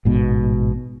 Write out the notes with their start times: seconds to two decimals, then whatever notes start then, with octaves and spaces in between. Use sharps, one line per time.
0.05 A1 G#2 B2